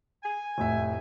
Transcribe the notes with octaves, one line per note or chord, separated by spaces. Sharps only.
G#5
F1 A2 E5